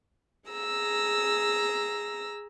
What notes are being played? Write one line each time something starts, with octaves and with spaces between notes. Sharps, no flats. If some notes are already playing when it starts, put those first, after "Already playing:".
G#4 A#5 E6